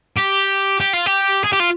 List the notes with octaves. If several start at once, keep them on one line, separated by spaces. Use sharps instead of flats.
G4
G4
F4
G4
G#4
G4
F4